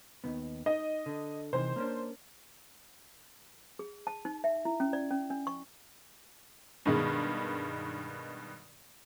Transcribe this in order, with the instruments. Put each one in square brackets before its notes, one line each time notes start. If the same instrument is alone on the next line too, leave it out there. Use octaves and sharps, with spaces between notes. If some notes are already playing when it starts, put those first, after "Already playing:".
[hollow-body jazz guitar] D#2 D#3 B3
[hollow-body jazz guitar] D#4 [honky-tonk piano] D#5
[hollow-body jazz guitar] D3
[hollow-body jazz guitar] C3 D#3 E3 [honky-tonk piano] C5
[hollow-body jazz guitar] A#3 C#4 D4
[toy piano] G#4
A5
D#4
E5
E4
C#4
D5
C#4
D4
C#6
[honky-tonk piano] G2 B2 D#3 G#3